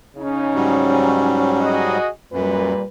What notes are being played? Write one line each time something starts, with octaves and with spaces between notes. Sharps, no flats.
C#3 C#4 D#4
G#2 F#3 G3
F#4 G#4 D#5
F#2 A#2 G3 B4